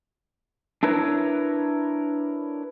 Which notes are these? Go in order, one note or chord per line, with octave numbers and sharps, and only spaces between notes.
D4 E4 A#4 B4 C#5